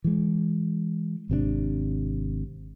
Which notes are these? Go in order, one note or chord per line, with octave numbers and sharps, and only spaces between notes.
E3 G#3
G#1 C3 D#3 D4